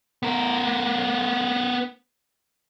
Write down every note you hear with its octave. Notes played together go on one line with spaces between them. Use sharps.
B3 A#4